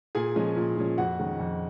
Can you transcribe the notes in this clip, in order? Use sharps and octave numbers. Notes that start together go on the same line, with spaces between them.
A#2 G#4 G#5
F3 G#3 C#4
A#2
F3 G#3 C#4
F2 F#4 F#5
D#3 G#3 C#4
F2